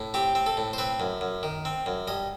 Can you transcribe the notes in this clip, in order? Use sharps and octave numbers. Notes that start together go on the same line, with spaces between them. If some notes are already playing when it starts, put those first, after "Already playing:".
Already playing: A2
C4 G4
C4
A4
A2
C5
C4 B4
F#2
F#2
D#3
C4
F#2
G2 D#5